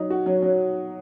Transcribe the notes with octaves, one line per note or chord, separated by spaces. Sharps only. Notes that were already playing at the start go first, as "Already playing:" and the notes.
Already playing: F#3 D#4
F#4
F#3
F#3